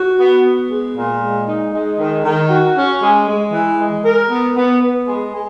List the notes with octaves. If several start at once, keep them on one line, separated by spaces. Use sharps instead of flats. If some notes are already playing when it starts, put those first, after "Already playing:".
Already playing: F#4
B3
B3
G#3
A#2
G#3
D#4
G#3
D#3
D#3
F#4
C#4
G#3
G#3
E3
G#3
A#4
B3
B3
B3
G#3
G#3